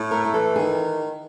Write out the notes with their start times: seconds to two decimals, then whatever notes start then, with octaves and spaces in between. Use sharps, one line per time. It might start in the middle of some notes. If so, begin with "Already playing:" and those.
Already playing: A2
0.11 A3 A#4
0.25 A#4
0.34 E3 A4
0.55 D#3 G#4